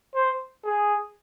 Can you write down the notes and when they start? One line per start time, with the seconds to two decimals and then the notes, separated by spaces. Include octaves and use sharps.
0.15 C5
0.64 G#4